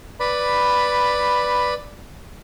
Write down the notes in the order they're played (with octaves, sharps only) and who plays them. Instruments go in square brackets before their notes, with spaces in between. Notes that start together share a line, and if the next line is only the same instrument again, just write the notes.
[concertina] B4 D5 B5